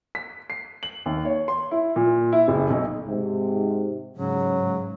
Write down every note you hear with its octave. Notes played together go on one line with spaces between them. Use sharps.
B6
C7
F#7
D#2
C#5
C6
E4
A#2
E4
F#1
B1
G#2 C3
G#2 C#3 F#3